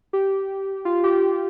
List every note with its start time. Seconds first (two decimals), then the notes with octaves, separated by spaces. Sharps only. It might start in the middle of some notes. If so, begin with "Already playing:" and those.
0.13 G4
0.85 F4
1.04 G4
1.22 G4